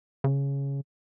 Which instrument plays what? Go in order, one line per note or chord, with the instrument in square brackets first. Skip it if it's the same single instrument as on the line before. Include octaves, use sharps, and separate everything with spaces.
[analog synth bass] C#3